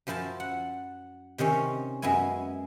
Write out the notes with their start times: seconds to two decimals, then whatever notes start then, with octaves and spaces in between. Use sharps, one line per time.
0.07 F#2 F3 E4 C5 A5
0.40 F#5
1.38 C3 D#3 C4 C#4
2.02 F#2 G#3 B3 E4 G#5